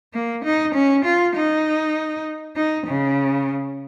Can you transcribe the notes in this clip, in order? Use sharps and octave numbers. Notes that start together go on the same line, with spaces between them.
A#3
D#4
C#4
F4
D#4
D#4
C#3